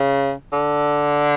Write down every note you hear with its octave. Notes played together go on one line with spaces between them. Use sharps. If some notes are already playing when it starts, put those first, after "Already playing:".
Already playing: C#3
D3